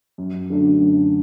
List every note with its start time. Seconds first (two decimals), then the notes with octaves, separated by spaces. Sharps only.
0.18 F#2
0.50 D3 F#3 A3 D4
0.81 F#2